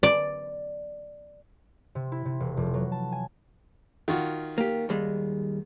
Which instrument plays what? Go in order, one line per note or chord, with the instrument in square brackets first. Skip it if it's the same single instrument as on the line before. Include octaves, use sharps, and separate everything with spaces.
[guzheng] D5
[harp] C3
E4
C3
E1
F1
F#3
A5
G#5
[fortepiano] D#3 F4 F#4
[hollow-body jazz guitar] A#3 G4
D#2 G3 G#3